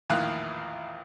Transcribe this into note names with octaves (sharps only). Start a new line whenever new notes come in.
A#1 E2 A2 D#3 F4 F#6